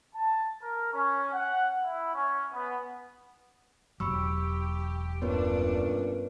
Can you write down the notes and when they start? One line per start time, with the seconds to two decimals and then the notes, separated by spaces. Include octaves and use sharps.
0.16 A5
0.62 A#4
0.93 C#4
1.33 F#5
1.84 E4
2.14 C#4
2.53 B3
4.00 E1 D#2 F#3 G4 B5 C#6 E6
5.22 G2 A#2 B3 C#4 D4 B4 C#5